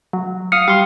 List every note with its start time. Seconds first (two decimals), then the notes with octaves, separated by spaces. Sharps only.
0.13 F#3
0.52 F5 D#6 F6 C#7
0.68 G3 F5 C6